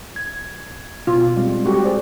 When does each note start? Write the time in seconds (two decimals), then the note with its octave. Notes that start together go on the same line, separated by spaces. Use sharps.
0.16 G#6
1.07 B2 F4
1.36 G3 G#3 C4
1.66 F#4 G4 A4
1.84 G#4 C5 D5